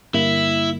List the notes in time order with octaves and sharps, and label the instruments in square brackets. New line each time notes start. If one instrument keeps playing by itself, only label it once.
[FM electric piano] G2 D3 G3 A#3 [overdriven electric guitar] E4